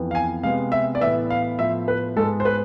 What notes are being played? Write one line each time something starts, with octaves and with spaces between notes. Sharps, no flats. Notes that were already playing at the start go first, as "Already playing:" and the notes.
Already playing: F2 E3 B3
F5
G#5
C3 G#3 B3 F5
E5
D5
A2 E3 B3 E5
F5
A2 F3 B3 E5
B4
G#2 G#3 B3 A4
C5
B4